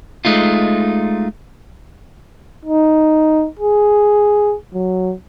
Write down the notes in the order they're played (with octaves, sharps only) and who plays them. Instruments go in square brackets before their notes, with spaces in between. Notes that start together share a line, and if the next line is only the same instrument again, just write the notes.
[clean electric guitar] G#3 A3 D#4 F4
[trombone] D#4
G#4
F#3